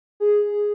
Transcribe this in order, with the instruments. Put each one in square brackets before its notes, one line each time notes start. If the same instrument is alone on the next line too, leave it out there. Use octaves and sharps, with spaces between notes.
[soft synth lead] G#4